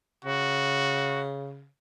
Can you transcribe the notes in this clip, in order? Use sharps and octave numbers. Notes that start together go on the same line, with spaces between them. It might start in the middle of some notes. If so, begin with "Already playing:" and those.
C#3 F#4